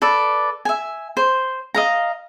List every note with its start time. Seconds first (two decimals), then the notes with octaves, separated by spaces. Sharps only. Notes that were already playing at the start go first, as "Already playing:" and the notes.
0.02 A4 B4 D5
0.65 E5 G#5
1.17 C5
1.74 D#5 F5 A#5